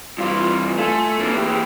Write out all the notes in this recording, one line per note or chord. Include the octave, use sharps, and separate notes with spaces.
G2 E3 F4
A3 F4 G#5
E3 F#3 A#3 C#4 D4
G4 G#4 E5